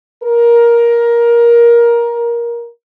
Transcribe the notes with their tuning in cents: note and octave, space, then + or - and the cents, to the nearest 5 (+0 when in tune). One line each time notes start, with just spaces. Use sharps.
A#4 +15